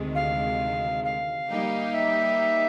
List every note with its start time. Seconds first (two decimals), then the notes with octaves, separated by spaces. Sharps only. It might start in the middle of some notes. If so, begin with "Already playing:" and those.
Already playing: D2 C3 D#3 G#3
0.15 F5
1.04 F5
1.49 G3 A#3 D#4 G4
1.94 E5